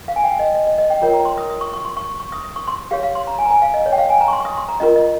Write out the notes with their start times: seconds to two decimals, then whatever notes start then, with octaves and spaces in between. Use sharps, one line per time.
0.08 F5
0.16 G#5
0.24 G5
0.39 D#5
0.55 D#5
0.67 D#5
0.78 D#5
0.90 G5
1.02 F4 A#4 C#5 G5
1.13 A#5
1.25 C6
1.38 D#6
1.50 D#6
1.61 C#6
1.73 C#6
1.85 C6
1.97 C#6
2.20 C#6
2.32 D#6
2.44 D#6
2.56 C#6
2.68 C6
2.91 G4 C#5 F5
3.03 F5
3.15 C6
3.27 A#5
3.39 G#5
3.46 A#5
3.51 G#5
3.62 F5
3.74 D#5
3.86 C#5
3.92 G5
3.98 F5
4.10 G#5
4.21 A#5
4.28 C#6
4.33 C6
4.40 C#6
4.45 D#6
4.57 C6
4.69 A#5
4.80 C#4 F4 A#4 D#5
4.96 D#5